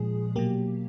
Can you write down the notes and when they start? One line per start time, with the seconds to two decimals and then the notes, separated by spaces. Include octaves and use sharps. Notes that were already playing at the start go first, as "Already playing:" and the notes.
Already playing: A#2 F3 G#3 G#4
0.36 B2 F#3 A#3 G4